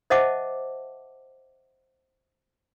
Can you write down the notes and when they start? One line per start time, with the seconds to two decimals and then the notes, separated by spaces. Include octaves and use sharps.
0.10 C5 D#5 E5 F#5 A5 D6